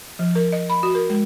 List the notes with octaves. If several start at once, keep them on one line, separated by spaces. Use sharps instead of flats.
F3
A#4
D#5
B5
F#4
A#4
G#3